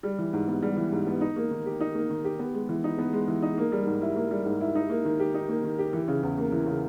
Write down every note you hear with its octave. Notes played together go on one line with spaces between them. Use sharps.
G3
E3
G#2
B3
G3
E3
G#2
B3
D#4
A#3
D#3
G4
D#4
A#3
D#3
G4
B3
G#3
E3
D#4
B3
G#3
E3
D#4
A#3
G3
G#2
E4
A#3
G3
G#2
E4
D#4
A#3
D#3
G4
D#4
A#3
D#3
G4
E3
C#3
E2
A#3
E3
C#3